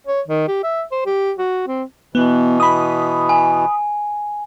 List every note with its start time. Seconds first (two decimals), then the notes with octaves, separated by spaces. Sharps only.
0.07 C#5
0.28 D#3
0.48 G4
0.63 E5
0.92 C5
1.06 G4
1.38 F#4
1.67 C4
2.15 B2 E3 B3
2.60 B5 D#6
3.29 G#5